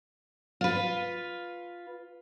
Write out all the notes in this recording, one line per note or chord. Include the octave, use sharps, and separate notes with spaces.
F4 B4